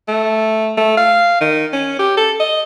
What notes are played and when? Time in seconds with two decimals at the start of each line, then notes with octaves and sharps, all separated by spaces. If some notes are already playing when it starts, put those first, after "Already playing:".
0.08 A3
0.77 A3
0.97 F5
1.41 D#3
1.73 C#4
1.99 G4
2.17 A4
2.40 D#5